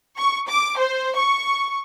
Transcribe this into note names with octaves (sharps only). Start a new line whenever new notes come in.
C#6
D6
C5
C#6